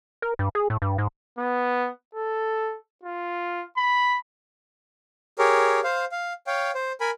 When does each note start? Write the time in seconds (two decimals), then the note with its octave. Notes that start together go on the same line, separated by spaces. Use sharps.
0.22 A#4
0.39 G2
0.55 G#4
0.70 A2
0.82 G2
0.98 G#2
1.38 B3
2.15 A4
3.03 F4
3.77 B5
5.39 G4 G#4 A#4 C#5
5.84 C5 F5
6.12 F5
6.47 C#5 F5 G5
6.75 C5
7.01 A#4 G#5 B5